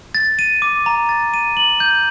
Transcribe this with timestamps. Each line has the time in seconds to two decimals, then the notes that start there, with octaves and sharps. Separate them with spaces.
0.15 A6
0.39 D#7
0.62 D6
0.86 A#5
1.09 A6
1.34 D#7
1.57 F#7
1.80 G6